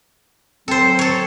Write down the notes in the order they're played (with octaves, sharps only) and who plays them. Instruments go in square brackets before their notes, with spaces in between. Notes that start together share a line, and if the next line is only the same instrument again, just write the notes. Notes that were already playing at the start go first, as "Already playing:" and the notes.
[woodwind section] F#3 C4 [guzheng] A4 C5
[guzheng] A4 C#5